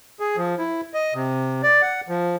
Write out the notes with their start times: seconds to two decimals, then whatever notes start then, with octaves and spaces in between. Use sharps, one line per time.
0.20 G#4
0.37 F3
0.59 E4
0.94 D#5
1.14 C3
1.63 D5
1.82 F#5
2.09 F3